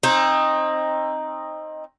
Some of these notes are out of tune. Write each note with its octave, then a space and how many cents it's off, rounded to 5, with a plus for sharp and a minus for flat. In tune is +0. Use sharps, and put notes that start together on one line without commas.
C4 +25 D#4 +0